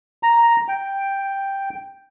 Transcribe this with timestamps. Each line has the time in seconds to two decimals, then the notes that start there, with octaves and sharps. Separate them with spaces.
0.23 A#5
0.68 G5